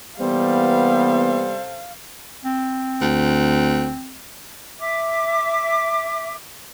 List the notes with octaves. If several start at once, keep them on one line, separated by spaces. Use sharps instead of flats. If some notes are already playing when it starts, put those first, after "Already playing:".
C3 E3 G3 A#3 B3 A4 C5 F5
C4
D2
E5 D6